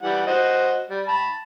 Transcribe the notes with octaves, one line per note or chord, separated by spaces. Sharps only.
E3 G3 F#5
F#4 C5 D#5
G3
A5 B5